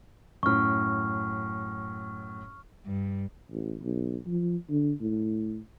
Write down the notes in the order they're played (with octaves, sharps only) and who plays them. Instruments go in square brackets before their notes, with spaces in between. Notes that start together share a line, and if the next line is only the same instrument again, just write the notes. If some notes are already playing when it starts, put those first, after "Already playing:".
[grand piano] F#2 A2 [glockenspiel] C#6 F6
[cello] G2
[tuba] A1
B1
F3
D3
A2